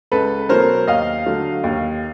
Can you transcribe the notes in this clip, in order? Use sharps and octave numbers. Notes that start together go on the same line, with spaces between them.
C#2 A4 B4
B2 F#3 A3 C#4 A#4 C5
D#2 D#5 F5
D3 F#3 A3
D#2